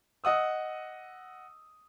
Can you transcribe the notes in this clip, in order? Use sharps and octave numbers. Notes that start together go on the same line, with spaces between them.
D#5 F#5 D#6 E6